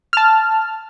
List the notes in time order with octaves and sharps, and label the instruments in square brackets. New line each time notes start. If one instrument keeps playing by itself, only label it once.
[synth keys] A5 F6